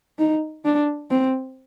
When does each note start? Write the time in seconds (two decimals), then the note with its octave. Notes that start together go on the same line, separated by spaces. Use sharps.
0.19 D#4
0.65 D4
1.11 C4